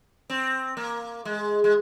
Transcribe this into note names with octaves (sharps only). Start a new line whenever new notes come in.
C4
A#3
G#3
G#3